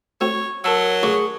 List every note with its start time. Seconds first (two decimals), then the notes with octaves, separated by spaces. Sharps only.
0.21 A3 C4 F#4 C#5
0.64 F#3 A#4 A5 E6
1.03 D2 C#3 G#4 D5 C#6